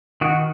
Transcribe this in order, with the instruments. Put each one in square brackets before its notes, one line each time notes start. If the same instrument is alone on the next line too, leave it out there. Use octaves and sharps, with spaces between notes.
[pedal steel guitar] D#3 F#4